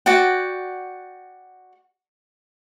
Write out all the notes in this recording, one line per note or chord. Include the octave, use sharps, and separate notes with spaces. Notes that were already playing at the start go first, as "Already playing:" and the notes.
F#4 D5 F#5 G5